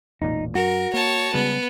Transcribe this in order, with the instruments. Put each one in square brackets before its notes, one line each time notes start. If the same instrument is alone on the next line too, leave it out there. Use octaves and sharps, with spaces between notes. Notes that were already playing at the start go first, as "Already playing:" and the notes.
[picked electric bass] E1 A1 A#2 [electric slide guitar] D#4
[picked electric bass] F#2 [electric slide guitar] F#4 [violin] A#4
[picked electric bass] A#3 [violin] C#5 A5
[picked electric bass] C#3 G3 G#3 [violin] B3